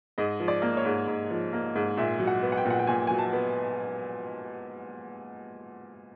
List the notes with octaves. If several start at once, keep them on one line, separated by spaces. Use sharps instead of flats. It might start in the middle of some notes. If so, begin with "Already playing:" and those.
G#2 D#5
F3
D5
A#3
C#5
G#2
G#2
F3
A#3
G#2
A#2 E5
F#3
F#5
B3
F#5
G5
A#2
F#5
G5
A#2 G#5
F#3 G#5
A5
B3